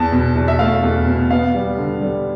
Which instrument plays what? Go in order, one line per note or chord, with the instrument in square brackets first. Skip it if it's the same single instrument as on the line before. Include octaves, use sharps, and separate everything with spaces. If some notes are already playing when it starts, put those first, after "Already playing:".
Already playing: [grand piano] E2 A5
B2
E2
E5
A3 F5
E2
B2
B3 F5
G3
D3
G3